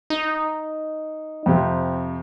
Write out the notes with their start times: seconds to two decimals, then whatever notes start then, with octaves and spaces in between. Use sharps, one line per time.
0.10 D#4
1.46 F2 C3